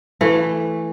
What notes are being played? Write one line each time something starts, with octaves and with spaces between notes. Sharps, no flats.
E3 A3